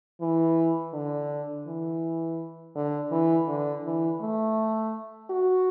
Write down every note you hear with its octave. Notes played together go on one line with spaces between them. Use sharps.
E3
D3
E3
D3
E3
D3
E3
A3
F#4